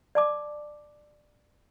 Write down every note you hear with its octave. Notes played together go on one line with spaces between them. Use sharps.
D5 A5 D6